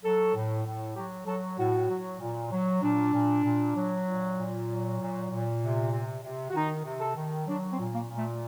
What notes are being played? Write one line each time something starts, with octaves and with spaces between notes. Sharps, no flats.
F#3 A4
A2
A2
F#3 G4
F#3 A4
A2 F#4
F#3
A#2
F#3
A#2 D4
A#2
A#2
F#3
A#2
A#2
F#3
A#2
A#2
C3
C3
C3
F#4
D#3 D#4
C3
A4
D#3
F#3 D4
C4
A#2
A#3
A#2
A3